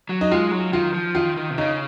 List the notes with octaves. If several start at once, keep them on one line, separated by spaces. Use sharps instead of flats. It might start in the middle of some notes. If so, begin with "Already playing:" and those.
F#3
D#4
G#3 F4
F#3
D#3 F4
F3
D#3 F4
D#3
C3
C#3 D#4